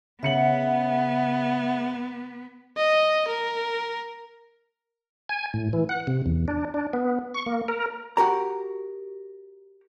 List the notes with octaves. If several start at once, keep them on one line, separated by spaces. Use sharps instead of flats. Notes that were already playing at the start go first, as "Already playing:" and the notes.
C#3 B3 E5 F#5 C#7 F#7
D#5
A#4
G#5
A2
E3
F#5
C3
E2
D4
D4
B3
C#6
A#3
A#4
F#4 G4 A#4 A#5